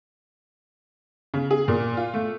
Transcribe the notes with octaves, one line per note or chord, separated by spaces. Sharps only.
C#3
G#4
A#2
F4
A3